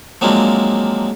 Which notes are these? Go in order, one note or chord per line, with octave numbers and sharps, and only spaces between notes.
F3 F#3 G#3 A#3 C4 D4